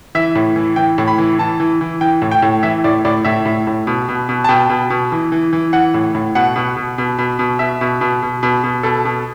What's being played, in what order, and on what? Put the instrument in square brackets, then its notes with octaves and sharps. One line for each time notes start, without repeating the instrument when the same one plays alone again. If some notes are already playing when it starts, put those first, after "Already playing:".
[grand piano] E3 E5
A2
E3
E3 G5
A2
B5
E3
E3 A5
E3
E3
E3 G5
A2
G5
A2
E3 E5
A2 D5
A2 D5
A2 E5
A2
A2
B2
B2
B2
A5
B2 G5
B2
B2
E3
E3
E3
E3 F#5
A2
A2
B2 F#5
B2
B2
B2
B2
B2
B2 E5
B2
B2
B2
B2
B2
B2 A4
B2